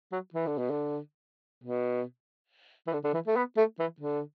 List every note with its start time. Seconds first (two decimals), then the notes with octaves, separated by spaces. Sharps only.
0.12 F#3
0.34 E3
0.47 D3
0.58 B2
0.70 D3
1.64 B2
2.87 E3
2.93 D3
3.04 D3
3.14 E3
3.27 A3
3.36 B3
3.57 A3
3.79 E3
4.00 D3